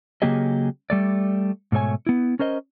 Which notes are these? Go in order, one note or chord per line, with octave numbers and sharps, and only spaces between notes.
C#3 F#3 A#3 G4 G#4 D#5
G3 A3 D5
G#2 B2 A3 C#5 G#5
B3 E4
C#4 A#4 C5 D#5